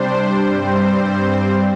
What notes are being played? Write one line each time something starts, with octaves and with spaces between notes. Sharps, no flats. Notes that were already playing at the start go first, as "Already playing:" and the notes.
Already playing: C3 G3 D4 C5
G2 G3 C4 C5